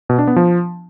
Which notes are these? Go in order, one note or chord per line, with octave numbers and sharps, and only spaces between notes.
B2
D4
B3
F3